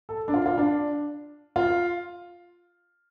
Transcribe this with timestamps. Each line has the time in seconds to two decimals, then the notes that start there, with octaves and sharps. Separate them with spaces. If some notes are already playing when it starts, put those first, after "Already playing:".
0.09 A4
0.28 D4
0.34 F4
0.46 F4
0.58 D4
1.56 F4